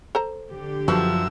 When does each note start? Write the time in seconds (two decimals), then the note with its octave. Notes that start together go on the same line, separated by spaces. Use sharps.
0.15 A4 C5 A#5
0.50 D3 G4
0.88 F#2 F3 F#4 A4 B4 E5 E6